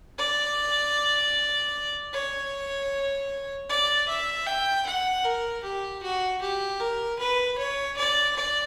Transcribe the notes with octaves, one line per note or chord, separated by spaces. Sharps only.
D5
C#5
D5
E5
G5
F#5
A#4
G4
F#4
G4
A#4
B4
C#5
D5
D5